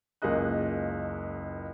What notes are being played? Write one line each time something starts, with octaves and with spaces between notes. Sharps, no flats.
F#1 C#2 A#3 G#4 D#5 F#6